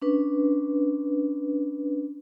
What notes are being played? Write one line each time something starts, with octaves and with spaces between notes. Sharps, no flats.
C#4 D4 B4